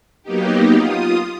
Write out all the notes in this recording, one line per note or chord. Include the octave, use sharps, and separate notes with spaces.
F#3 A#3 B3 D#4 G4
F4 D#6